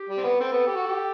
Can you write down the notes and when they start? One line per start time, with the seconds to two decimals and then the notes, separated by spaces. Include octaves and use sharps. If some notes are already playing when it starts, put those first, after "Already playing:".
Already playing: G4
0.09 G3
0.18 C4
0.24 B3
0.40 C4 A4
0.52 B3
0.67 G4
0.75 F#4
0.86 G4